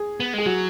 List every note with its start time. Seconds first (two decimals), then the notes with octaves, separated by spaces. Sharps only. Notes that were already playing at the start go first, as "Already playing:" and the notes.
Already playing: G#4
0.20 B3
0.34 G#3 G#4
0.46 F#3 F#4